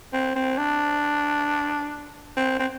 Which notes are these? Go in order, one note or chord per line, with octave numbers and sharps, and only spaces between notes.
C4
C4
D4
C4
C4